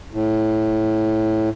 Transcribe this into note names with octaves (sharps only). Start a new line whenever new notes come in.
A2